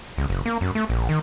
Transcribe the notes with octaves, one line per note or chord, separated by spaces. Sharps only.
C#2
F#1
A#3
F#2
A3
A#1
D#3